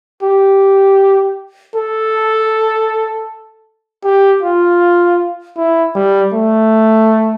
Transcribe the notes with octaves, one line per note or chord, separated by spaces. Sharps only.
G4
A4
G4
F4
E4
G3
A3